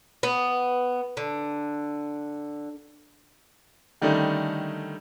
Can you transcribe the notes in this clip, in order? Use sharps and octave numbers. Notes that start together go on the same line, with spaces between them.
B3
D3
D3 D#3 G3 A3 C#4 D#4